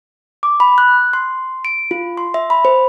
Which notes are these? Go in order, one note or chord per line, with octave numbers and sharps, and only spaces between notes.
D6
B5
F#6
C6
D7
F4
C6
E5
B5
C5